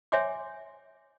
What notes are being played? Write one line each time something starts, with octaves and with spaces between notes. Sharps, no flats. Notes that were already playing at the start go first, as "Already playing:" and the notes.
C#5 E5 G5 G#5 C6 D6